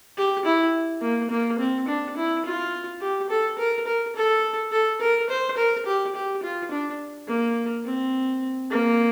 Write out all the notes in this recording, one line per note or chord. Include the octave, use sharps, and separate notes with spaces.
G4
E4
A#3
A#3
C4
D4
E4
F4
G4
A4
A#4
A#4
A4
A4
A#4
C5
A#4
G4
G4
F4
D4
A#3
C4
A#3